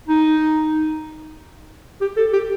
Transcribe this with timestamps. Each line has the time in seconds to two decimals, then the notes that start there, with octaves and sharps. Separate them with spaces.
0.08 D#4
2.01 G4
2.17 A4
2.33 G4